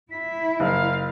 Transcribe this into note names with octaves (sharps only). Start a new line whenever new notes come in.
E4 B6
F#1 F5